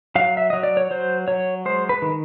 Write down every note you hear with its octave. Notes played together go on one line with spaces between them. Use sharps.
F#3 F5
E5
F#3 D#5
D5
C#5
F#3 C5
F#3 C#5
G#3 C5
B4
D#3